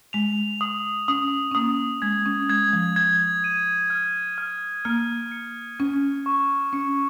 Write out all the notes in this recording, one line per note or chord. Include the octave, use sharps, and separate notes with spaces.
G#3 F7
D#6
C#4 D#6
C#4
A#3 D#6
G#3 G#6
C#4
G#3 G#6
G#3
F3
G#6
D#7
F6
F6
A#3 F6
C#7
C#4 G#6
C#6
C#4 C#7